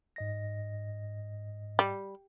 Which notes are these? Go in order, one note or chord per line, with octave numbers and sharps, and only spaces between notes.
G#2 D#5 A#6
G3